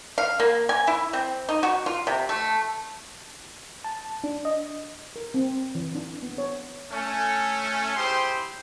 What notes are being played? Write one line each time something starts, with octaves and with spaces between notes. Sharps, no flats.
F5
A#3
G#5
E4
C4
D#4
F#4
F4
C3
A3
A5
D4
D#5
A#4
C4
E3
D4
B3
C#5
A3 C#4
E4 G4 G#4 C5 G5 C6